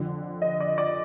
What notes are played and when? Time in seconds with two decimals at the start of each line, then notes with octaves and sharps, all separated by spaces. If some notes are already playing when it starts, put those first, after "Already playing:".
Already playing: F2 D3 F3
0.42 D#5
0.60 D5
0.78 D5